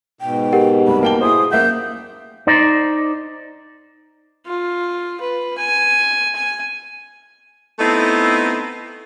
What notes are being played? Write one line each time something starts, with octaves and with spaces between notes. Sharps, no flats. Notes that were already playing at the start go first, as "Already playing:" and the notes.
G#2 B2 G5
G4 A#4 F#5
C2 B5
A#3 G5 A5 G7
E4 G#4 C5 D#6
F#2 A#3 E5 F#5 G6
D#4 C5 D5
F4
B4
G#5
G#5
A3 B3 C4 D#4 E4 A4